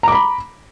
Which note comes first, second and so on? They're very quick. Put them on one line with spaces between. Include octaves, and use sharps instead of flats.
A#5 D6 B5